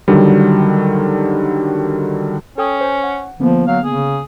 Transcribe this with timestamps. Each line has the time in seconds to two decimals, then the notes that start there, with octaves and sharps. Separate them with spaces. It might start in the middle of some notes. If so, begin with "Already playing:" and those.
0.08 D3 D#3 F#3 G3
2.58 C#4 A4 G5 D#6
2.81 C5 G#5
3.03 F#5
3.40 D3 F3 A#3 B3
3.67 F#3 F5
3.85 C#3 G#4